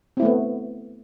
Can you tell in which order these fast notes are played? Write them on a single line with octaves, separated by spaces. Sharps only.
C4 E4 A3 B3